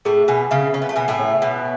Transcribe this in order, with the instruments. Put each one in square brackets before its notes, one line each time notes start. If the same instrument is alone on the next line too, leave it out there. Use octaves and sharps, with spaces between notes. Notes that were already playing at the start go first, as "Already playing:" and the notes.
[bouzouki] A2 A3 [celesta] G#4
[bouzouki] B2 B3 [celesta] G#5
[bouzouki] C#3 C#4 [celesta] E5
[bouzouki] C#4 [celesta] E5
[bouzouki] B3
A3
[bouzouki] B2 B3 [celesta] G#5
[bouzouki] A2 A3
[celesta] C#5
[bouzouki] B2 B3 [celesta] F#5